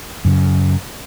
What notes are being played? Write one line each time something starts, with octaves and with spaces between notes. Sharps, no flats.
F#2 C#3